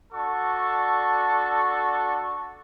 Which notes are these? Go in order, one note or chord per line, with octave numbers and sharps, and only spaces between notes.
D4 F#4 A4 A5 C#6